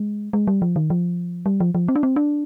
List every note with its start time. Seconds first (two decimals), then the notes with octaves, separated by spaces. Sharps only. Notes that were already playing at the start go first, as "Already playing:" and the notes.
Already playing: G#3
0.33 G#3
0.47 G3
0.62 F3
0.76 D#3
0.90 F3
1.46 G3
1.60 F3
1.75 F3
1.88 C4
1.96 D4
2.03 C4
2.16 D4